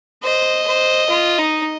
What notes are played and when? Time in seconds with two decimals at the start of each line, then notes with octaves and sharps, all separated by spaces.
0.24 C5 D#5
0.67 C5
1.09 F4
1.38 D#4